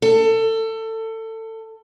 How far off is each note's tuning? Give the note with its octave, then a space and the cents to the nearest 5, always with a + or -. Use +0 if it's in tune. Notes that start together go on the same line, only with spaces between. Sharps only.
A4 +25